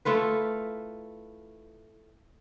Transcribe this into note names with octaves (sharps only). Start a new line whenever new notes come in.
A3 E4 F4 B4